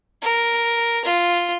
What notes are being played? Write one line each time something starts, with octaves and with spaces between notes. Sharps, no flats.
A#4
F4